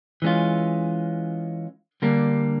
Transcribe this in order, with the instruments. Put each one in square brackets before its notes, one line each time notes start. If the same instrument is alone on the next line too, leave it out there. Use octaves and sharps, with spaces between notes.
[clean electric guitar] E3 G#3 C#4 F4
D3 G3 A#3 D4